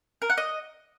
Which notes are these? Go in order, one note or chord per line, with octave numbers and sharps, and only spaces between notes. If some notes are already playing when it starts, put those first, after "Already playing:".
A#4
F#5
D#5